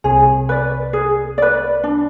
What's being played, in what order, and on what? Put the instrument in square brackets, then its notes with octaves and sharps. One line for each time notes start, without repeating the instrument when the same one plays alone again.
[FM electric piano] C2 C3 [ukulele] G#4
[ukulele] B4 D5
G#4
B4 D5
D4